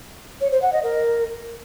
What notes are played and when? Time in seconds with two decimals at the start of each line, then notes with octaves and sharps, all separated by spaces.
0.41 C#5
0.52 C5
0.62 F#5
0.73 D#5
0.83 A#4